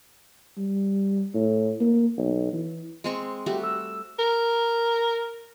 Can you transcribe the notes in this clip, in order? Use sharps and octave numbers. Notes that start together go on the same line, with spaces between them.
G3
A2
A#3
B1
E3
G#3 C4 C#6
G3 A3 F#4 G4
E6
A#4